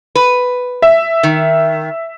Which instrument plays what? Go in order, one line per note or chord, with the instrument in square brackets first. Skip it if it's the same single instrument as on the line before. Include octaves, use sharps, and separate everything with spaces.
[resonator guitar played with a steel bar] B4
[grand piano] E5
[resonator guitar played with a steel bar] D#3